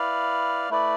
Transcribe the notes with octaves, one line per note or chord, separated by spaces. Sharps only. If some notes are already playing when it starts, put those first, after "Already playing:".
Already playing: E4 B4 D5 F5
A3 E4 B4 D5